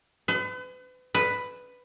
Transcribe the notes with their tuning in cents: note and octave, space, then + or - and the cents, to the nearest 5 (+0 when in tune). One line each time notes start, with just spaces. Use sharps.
B4 +40
B4 +5